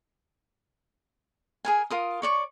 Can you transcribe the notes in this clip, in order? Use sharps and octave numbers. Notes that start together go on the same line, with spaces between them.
G#4 A#4 G#5
F4 A#4 D#6
C#5 D5 C#6